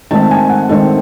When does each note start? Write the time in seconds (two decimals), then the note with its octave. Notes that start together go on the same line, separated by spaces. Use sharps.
0.11 G#2 D#3 A3 C4 A5
0.31 G#5
0.50 F#5
0.69 G#2 D#3 A3 C4 A4